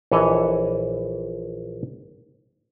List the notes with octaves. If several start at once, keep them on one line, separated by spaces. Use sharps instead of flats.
A#1 E3 A4 B4 C#5 D#5